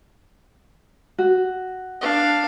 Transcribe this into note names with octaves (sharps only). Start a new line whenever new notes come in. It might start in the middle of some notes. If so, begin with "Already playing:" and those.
F#4
D4 F5